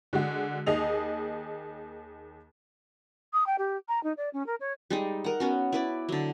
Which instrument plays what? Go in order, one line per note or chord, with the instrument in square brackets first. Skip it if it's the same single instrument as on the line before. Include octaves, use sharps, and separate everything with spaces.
[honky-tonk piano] D3 G#3 F#4
D#2 G#4 D#5 F7
[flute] D#6
G5
G4
A#5
D#4
D5
C#4
A#4
C#5
[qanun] G3 G#3 D#4
A#4 F#5
B3 C#4 F#4
E4 B4 D5
D3 F#3